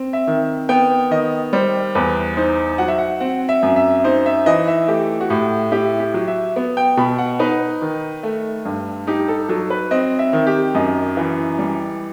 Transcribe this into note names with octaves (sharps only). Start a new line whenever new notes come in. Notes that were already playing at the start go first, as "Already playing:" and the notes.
Already playing: C4
E5
D#3
B3 G5
D#3 D#5
G3 C5
E2 B4
D#4 C5
F#3 F#5
E5
F#5
C4 F#5
E5
F#2
E5
D#4 C5
E5
E3 D#5
E5
A3 G4
F#4
A2 G4
E4 G4
G4
F#3
E5
B3
G5
B2 B5
F#5
D#4 B4
D#3
A3
G2
D#4 G4
A4
F#3 A4
B4
C4 D#5
E5
D#3
G4
F#2 D#5
E3
G3